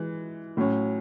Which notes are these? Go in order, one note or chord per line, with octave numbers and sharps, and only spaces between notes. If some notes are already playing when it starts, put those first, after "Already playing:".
Already playing: E3 G#3
A2 F#3 C#4